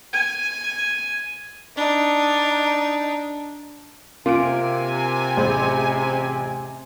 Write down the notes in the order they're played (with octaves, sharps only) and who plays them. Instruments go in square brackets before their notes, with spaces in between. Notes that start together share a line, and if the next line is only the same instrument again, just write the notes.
[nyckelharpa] G#5
[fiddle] D4 D#4
[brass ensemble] C3 [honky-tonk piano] A#3 D7 [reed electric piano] F4 D6 [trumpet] G#5
[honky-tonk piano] A1 G#4 C5